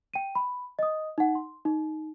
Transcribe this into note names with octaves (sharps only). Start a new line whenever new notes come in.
G5 D#7
B5
D#5 D#6
D#4 F#5
C6
D#4